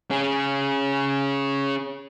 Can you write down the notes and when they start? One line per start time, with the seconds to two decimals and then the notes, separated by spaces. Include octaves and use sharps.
0.10 C#4 G#4